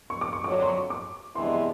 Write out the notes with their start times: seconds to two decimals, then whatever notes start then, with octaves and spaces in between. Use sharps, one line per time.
0.10 C#6
0.21 D6
0.33 C#6
0.44 F2 D3 F#3 D6
0.62 C6
0.67 C#6
0.90 D6
1.36 C3 E3 G#3 B3 D4 C6
1.48 C6